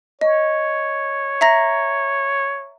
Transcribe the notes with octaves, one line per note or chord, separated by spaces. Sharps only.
C#5 D#5
E5 A#5 A#6